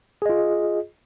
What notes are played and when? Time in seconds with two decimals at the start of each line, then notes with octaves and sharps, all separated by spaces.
0.22 G#4
0.26 D#5
0.29 F4